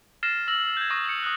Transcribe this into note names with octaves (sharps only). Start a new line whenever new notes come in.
F6 A6 A#6 C7 E7
E6 A#6 F#7
G6 G#6
C#6 D#6 A6 A#6
G6 C#7
D#6 F#6